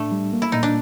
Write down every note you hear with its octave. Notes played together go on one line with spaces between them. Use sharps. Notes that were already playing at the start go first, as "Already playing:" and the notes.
Already playing: A2 A3 D4
G3
A#3
E4
A#2 D#4
D4